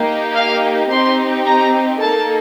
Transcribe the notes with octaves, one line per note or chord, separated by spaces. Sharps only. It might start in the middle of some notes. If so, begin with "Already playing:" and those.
Already playing: A#3 D#4 G4
F5
C4 D#4 G4 C6
A#5
A#3 D#4 A4 A5